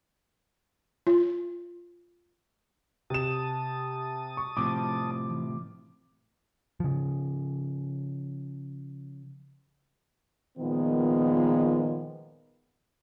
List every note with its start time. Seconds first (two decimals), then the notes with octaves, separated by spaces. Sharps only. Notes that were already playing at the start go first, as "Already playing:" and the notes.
1.07 F4
3.10 C3 A5 D#6 E7
4.37 C#6
4.57 A2 C3 F3 D6
5.30 E3
6.80 C#3 F3
10.58 A#2 D#3 F3 G#3 B3